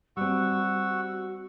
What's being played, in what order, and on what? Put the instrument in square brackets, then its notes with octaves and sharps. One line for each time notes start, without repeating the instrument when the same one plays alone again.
[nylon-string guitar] G3 C4 [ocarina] F#4 [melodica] F#5 C#6 E6